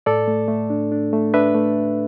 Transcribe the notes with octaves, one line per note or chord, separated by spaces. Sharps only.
A2 A4 D5
A3
A3
D4
D4
A3
D4 B4 E5
A3